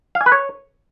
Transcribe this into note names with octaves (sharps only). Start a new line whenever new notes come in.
F5
G#5
B4
C#5